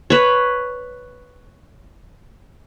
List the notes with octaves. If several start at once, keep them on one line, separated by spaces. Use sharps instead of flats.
B4 C#5